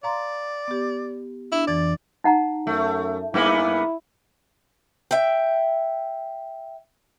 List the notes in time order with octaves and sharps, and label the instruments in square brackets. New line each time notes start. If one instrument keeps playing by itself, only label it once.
[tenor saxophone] D5 [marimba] F5 A#5 C6
[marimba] B3 G4
[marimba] D4 [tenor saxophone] E4
[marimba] F2 E3 A6 [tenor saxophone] D5
[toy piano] D#4 F#5 A#5
[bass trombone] F#2 [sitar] A3
[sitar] G2 A#3 B3 [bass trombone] E4
[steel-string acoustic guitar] E5 G5